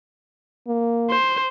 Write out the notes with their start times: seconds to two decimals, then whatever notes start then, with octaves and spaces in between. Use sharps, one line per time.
0.68 A#3
1.10 C5